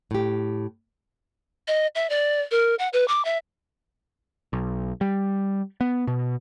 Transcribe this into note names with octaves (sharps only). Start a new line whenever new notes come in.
A2 G4
D#5
E5
D5
A#4
F#5
B4
D6
E5
B1
G3
B3
B2